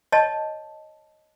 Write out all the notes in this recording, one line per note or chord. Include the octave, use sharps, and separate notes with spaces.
C#5 D#5 A5